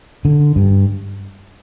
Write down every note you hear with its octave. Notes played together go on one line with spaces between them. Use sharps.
D3
G2